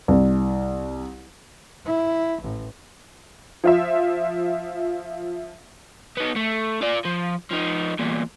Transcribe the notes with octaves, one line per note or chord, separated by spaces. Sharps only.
C2
E4
A1
F3 F4 E5
B3 D#4
A3
F4 D5
F3
F3 D#4
E2 A#2